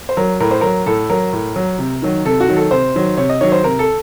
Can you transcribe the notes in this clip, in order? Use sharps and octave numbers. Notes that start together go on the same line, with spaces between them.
C5
F#3 A#4
A2 A#4
C5
F#3 A#4
A2 A4
F#3 A#4
A2
F#3
C3
D#3 F#3
C3 A4
F#4
D#3 F#3
A4
C3 C5
D#3 F#3
C3 C#5
D#5
D#3 F#3 C#5
C5
C3 A#4
A4